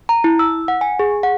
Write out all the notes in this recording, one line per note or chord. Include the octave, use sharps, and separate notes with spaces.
A#5
E4
E6
F#5
G#5
G#4
F#5